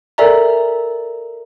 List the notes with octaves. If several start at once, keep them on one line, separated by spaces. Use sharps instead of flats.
A4 A#4 D5 E5 G#5 A#5